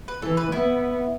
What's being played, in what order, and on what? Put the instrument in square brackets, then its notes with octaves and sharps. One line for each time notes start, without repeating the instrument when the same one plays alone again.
[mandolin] B4
[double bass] E3 [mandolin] A4
[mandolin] B4
[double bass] B3 [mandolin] E4